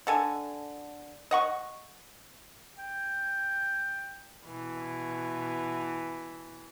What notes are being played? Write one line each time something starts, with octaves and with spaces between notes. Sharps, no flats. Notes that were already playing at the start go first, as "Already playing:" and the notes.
D3 A4 G#5
D#5 F#5 C#6
G5
B2 E3